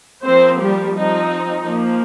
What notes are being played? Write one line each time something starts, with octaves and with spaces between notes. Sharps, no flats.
F3 A#3 C4 C5
G3 G4
F3 C4 D#4
F3 A#3